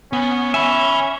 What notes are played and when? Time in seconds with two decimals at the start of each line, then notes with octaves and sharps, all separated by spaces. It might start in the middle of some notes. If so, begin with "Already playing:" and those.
0.13 B3 C#4
0.54 E5 G#5 B5